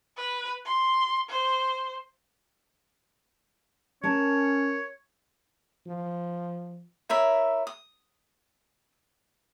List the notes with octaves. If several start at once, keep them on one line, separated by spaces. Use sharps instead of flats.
B4
C6
C5
C#4 A#4 C#5 A5
F3
E4 A#4 C#5 E5
D#6